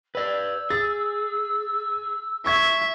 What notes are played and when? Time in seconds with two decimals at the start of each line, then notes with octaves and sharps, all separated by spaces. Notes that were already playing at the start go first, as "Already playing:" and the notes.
0.15 B4 D5 E6
0.70 G#4 A6
2.46 E5 C#6 G#6